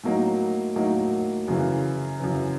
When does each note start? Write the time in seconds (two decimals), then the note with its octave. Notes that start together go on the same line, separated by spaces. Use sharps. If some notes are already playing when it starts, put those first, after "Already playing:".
0.04 A2 F#3 A#3 D#4
0.76 A2 F#3 A#3 D#4
1.48 F#2 C#3 E3
2.20 F#2 C#3 E3